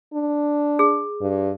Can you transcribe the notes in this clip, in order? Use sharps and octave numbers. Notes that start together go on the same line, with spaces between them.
D4
G#4
G2